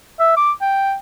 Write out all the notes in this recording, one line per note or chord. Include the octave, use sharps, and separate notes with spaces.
E5
D6
G5